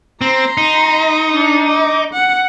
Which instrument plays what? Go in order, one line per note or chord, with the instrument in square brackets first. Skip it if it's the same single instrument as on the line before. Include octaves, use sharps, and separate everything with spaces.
[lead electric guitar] C4 [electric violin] A#5 C6
[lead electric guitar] D#4
[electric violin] D4
D6
F#5